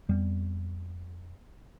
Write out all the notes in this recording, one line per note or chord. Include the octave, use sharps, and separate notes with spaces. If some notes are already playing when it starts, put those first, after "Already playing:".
F2 G3 B3